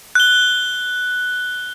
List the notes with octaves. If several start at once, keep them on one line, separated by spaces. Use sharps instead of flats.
F#6 G7